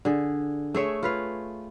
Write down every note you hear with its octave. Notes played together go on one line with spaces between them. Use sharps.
D3 G#4
A3 G#4 C#5 E5
F4 B4 F5